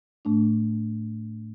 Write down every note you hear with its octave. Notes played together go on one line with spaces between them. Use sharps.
A2 A3 D4